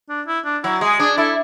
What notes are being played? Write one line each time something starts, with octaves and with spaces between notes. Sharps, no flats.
D4
E4
D4
F#3 E4
G#3 G#4
D4 G#4
E4 A4